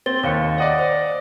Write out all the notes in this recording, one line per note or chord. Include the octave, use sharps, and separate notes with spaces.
C4 A6 G7
D#2 C#5 F5 C#7
D5 D#5 F#5
C5